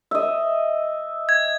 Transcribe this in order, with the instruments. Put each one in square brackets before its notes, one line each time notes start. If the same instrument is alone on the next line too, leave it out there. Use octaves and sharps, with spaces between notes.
[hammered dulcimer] D#5 E5
[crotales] G#6